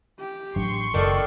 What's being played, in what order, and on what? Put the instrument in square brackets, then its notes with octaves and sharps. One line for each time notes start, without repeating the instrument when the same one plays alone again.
[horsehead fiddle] G4
[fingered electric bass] A1 F#3 D4 [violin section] C6 C#6
[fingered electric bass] F#1 [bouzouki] D#3 [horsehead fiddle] A4 D5